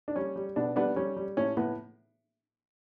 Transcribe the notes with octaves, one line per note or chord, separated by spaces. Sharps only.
D4
G3 C#4
G3
B2 B3 D4
G3 B3 D4
G3 C#4
G3
A2 C#4
A2 B3